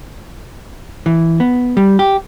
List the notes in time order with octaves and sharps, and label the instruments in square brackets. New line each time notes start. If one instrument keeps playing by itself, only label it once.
[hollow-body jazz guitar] E3
B3
G3
G4